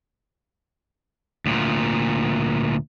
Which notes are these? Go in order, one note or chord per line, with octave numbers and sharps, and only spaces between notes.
D2 A#2